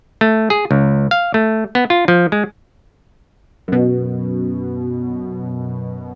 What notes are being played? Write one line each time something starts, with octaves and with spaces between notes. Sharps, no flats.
A3
G#4
C#2
F5
A3
B3
F4
F3
G#3
F#2 B2